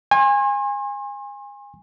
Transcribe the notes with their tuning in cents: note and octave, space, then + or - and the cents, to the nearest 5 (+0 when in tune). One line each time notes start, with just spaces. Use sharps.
G#5 -25 C6 +40